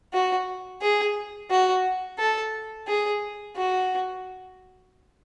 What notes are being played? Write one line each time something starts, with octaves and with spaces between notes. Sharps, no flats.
F#4
G#4
F#4
A4
G#4
F#4